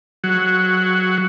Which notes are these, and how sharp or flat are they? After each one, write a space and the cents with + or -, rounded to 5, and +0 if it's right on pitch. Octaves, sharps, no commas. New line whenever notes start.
F#3 +0 F#4 +0